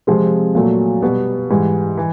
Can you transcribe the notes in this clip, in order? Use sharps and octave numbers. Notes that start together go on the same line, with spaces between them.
C3 F3 G#3 C4
A#2 F#3 A3
B2 G3 B3
G#2 E3 G3
E3